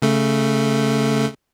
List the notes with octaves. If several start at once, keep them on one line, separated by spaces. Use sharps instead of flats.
C#3 A3